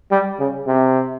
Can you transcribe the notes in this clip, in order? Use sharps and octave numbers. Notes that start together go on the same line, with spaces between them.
G3
C#3
C3